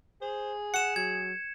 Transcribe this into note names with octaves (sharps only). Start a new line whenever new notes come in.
G#4 C5
F#5 C#7 E7
F#3 G#6